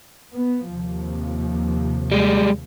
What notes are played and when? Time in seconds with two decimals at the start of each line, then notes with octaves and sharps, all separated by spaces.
0.33 B3
0.70 D#2 C3 F3
2.12 G3 G#3